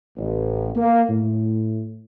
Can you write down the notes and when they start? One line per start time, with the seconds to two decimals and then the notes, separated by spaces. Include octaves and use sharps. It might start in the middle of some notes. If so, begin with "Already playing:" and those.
0.17 A1
0.76 A#3
1.09 A2